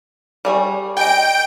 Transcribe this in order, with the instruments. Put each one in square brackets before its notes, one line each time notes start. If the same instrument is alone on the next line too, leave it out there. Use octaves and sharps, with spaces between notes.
[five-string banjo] G3 G#4 C#5
[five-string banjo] D#5 G#5 [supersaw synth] G5 D7